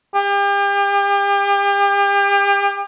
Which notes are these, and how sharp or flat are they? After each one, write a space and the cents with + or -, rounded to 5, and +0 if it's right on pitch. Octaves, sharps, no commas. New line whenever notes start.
G4 +40